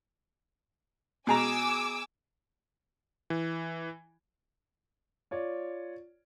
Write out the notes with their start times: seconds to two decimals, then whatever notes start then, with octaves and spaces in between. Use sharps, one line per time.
1.27 B2 G#4 G#5 A#5 D6 E6
3.30 E3
5.31 F4 C#5 D5